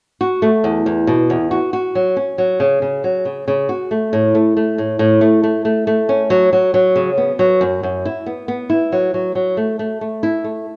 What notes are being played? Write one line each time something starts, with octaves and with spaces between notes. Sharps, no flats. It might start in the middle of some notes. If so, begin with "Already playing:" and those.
F#4
A3
E2
E2
B2
E2
F#4
F#4
F#3
C#4
F#3
C#3
C#3
F#3
C#3
C#3
F#4
A3
A2
A3
A3
A2
A2
A3
A3
A3
A3
C#4
F#3
F#3
F#3
C#3
B3
F#3
F#2
F#2
E4
B3
B3
E4
F#3
F#3
F#3
A3
A3
A3
E4
A3